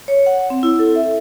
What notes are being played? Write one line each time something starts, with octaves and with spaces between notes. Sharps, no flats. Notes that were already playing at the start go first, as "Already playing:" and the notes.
C#5
F#5
C4
E4
A4
E5